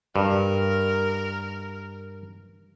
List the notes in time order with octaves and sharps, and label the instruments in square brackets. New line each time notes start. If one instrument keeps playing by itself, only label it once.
[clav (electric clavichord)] G2 [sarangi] A#4